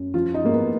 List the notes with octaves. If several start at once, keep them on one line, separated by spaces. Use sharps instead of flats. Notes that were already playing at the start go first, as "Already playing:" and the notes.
Already playing: F#2
F3 F4
D#4
G#2 A#3
B3